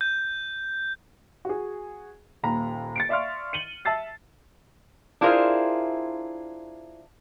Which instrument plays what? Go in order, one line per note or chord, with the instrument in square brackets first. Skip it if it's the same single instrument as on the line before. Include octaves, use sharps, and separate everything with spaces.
[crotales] G6
[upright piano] F#4 G#4
D#1 D#2 A#5 B5
A6 C#7 D7
D5 E5 F5 C6 C#6 F6
C#7 D#7 F#7 G7
E5 A5 E6 A6 C7
[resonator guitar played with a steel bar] D4 E4 F4 G#4 A#4 C5